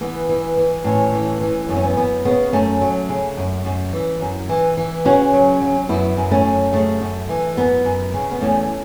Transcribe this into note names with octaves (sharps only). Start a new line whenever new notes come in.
E3 B3
E3
E3
A2 A3 C#4
E3
E3
F#2 B3
C#4
B3
F#2 B3
C#3 B3
F#2 A3 C#4
F#3
C#3
F#2
F#2
E3
F#2
E3
E3
C#3 C#4 F#4
F#3
F#3
F#2 B3 E4
F#2
A3 C#4
F#2
C#3 A3
F#2
E3
F#2 B3
F#2
C#3
B3
E2 A3 C#4